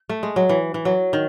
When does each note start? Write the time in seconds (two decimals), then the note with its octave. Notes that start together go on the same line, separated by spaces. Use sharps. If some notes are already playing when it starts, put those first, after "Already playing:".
Already playing: C4
0.09 A3
0.23 G#3
0.36 F#3
0.49 E3
0.74 E3
0.85 F#3
1.13 D#3